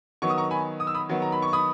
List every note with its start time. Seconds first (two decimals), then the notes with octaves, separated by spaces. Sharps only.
0.22 D#3 F#3 B3 C#6
0.30 D#6
0.38 A#5 C#6
0.51 G#5 B5
0.80 D#6
0.87 E6
0.94 B5 D#6
1.09 D#3 F#3 B3
1.22 A#5
1.32 B5
1.42 C#6
1.53 B5 D#6